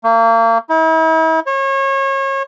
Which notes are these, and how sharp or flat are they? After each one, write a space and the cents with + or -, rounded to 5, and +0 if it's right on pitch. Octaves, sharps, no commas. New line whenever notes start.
A#3 -35
E4 -40
C#5 -30